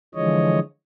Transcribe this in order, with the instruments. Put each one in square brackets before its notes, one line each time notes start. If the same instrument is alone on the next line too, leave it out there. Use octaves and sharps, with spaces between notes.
[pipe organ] D3 E3 F3 G#3 C#5 D#5